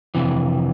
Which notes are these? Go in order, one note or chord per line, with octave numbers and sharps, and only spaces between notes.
F2 C3 E3